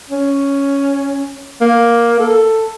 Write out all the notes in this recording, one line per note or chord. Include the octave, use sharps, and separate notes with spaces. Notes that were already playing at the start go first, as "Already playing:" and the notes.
C#4
A#3
A4